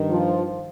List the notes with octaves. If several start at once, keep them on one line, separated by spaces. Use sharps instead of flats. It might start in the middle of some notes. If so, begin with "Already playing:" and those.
Already playing: G2 D#3
F3